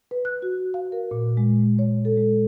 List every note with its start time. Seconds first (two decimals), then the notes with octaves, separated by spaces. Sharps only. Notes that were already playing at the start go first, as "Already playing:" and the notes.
0.11 B4
0.25 F#6
0.42 F#4
0.74 F5
0.92 A#4
1.11 A#2
1.37 G#3
1.79 C#5
2.05 A4
2.17 G#3